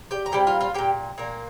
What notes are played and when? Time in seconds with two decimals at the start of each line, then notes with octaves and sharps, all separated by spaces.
0.11 G4 G5
0.26 A#5
0.32 A#2 G3 C4 G4 G5
0.47 F4 F5
0.61 F4 F5
0.74 A#3 G4 G5
0.78 A#2
1.18 A#2 A#3